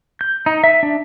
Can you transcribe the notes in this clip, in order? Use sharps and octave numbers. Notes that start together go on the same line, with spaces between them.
G6
D#4
E5
D4